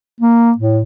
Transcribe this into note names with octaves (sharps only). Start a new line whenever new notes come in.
A#3
A2